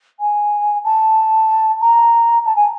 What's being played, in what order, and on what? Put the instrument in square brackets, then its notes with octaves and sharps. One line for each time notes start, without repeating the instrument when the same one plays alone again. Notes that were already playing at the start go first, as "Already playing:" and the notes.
[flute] G#5
A5
A#5
A5
G#5